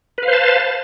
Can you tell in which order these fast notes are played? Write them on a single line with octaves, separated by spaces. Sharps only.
B4 F5 C5 A5